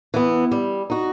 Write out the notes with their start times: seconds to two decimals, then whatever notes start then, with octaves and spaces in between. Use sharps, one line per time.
0.14 E3 B3
0.52 G3
0.90 D#4 F#4